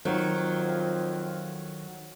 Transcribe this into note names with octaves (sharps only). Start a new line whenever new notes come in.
F2 D#3 F#3